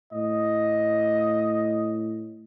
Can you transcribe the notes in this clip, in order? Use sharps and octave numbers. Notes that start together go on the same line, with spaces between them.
A2 D#5